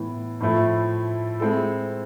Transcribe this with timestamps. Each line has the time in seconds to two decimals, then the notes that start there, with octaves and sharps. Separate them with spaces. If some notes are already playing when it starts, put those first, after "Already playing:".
Already playing: A2 E3 B3
0.40 A2 F3 A3 E4
1.40 G#3 C4 E4 A4